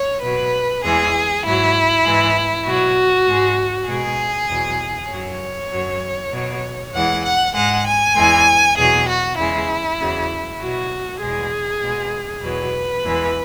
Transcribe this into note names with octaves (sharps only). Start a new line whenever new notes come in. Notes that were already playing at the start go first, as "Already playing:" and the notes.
Already playing: C#5
B2 F#3 B4
E2 E3 G#3 G#4
G#2 F#3 E4
G#2 E3 G#3
B2 F#3 F#4
G#2 G#3
B2 G#3 G#4
E2 B2 F#3
F#2 F#3 C#5
F#2 F#3
B2 F#3
E2 E3 G#3 F#5
F#5
G#2 G#3 F#5
G#5
E2 E3 G#3
E2 B2 F#3 G#4
F#4
E2 C#3 G#3 E4
E2 C#3 F#3
B2 F#3 F#4
E2 B2 G#3 G#4
B2 G#3
E2 B2 F#3 B4
E2 E3 G#3